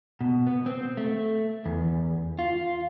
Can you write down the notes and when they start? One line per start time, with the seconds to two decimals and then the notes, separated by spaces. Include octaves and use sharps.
0.21 B2
0.47 B3
0.66 C4
0.97 A3
1.66 E2
2.39 F4